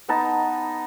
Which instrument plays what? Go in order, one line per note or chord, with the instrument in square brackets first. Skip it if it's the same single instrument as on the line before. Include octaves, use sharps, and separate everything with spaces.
[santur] B3 D#4 A5